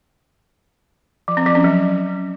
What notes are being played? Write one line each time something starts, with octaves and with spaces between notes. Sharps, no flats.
F3
C4
F3
C#4
F#3